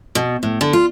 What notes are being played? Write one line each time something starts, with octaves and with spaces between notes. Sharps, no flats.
B2
A2
D3
F4